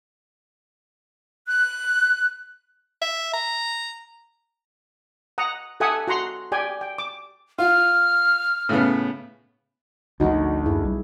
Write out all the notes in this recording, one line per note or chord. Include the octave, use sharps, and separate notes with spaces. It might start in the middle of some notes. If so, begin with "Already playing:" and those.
F#6
E5
A#5
F#5 A#5 D#6
G4 A4 E5 F#5 G#5 D#6
F#4 F#5 A#5 C6
G4 D5 G5 G#5
G5
D6
F4 F6
A2 C#3 B3
G#1 D2 D3 F3 D#4 F#4
F#2 D#4 E4 G#4
B1 G3